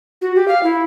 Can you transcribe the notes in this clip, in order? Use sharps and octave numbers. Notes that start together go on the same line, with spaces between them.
F#4
G4
F5
E4